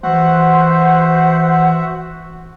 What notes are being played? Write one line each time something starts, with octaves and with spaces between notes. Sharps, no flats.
E3 F#4 C5 E5 F#5